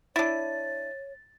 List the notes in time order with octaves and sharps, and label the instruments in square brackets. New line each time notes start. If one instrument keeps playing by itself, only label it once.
[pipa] D4 E4 [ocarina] C#5 [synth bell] A6